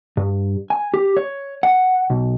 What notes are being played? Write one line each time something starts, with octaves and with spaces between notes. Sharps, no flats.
G2
G#5
G4
C#5
F#5
B1